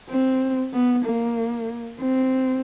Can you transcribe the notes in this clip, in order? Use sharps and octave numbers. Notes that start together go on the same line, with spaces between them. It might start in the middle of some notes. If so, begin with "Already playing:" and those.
C4
B3
A#3
C4